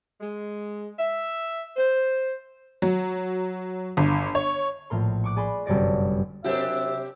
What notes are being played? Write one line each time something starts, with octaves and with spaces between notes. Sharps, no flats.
G#3
E5
C5
F#3
G1
C#5
A#1 A2 A#4 C6
C#6 D6 F#6
G#4 D5 G#5 B5 C6
G1 F#2 C3 C#5 D5 A#6
C3 F#3 C4 D4 G4 A#4 E5